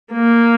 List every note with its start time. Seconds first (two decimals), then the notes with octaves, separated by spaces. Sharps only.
0.12 A#3